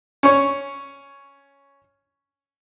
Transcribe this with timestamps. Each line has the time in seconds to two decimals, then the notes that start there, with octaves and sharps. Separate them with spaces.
0.23 C#4 C#5